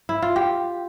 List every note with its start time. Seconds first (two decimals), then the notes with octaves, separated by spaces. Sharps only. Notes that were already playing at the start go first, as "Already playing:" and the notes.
Already playing: D4
0.09 E4
0.22 F4
0.36 G4